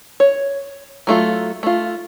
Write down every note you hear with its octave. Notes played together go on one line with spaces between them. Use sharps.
C#5
F#3 A3 F4
A3 F4